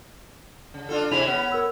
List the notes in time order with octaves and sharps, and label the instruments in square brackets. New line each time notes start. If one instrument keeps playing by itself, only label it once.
[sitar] C#3
D4 F4 A4
[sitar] C3 E4 G#4 [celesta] F7
[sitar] B3 C#4
[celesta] A#4 E6